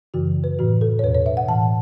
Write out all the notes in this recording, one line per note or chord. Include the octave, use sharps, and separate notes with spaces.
F#2 C#3 E3 F#4
B4
A2 E3 F#4
A4
C#5
E2 B2 B4
C#5
E5
F#5
A2 E3 A5